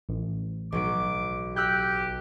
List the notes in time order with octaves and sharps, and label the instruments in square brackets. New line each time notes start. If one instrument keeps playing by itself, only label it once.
[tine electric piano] A1
[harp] B1 F#3 D7 [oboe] D6
[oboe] G4 [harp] E6 F#6 G6